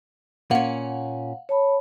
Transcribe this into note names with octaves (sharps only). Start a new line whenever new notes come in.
A#2 C#4 F5 F#5
C#5 A5 B5